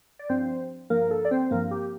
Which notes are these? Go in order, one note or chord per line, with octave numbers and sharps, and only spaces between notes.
D5
G2 F3 C4 C5
G2 F3 A#3 A#4
A4
D5
C4 C5
G2 F3 A#3 A#4
G4